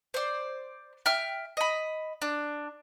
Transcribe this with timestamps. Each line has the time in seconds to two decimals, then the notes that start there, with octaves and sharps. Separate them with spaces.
0.14 C5 D5
1.06 E5 G5 F6
1.57 D#5 B5
2.22 D4